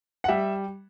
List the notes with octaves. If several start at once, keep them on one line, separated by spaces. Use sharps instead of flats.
F#5
G3 E5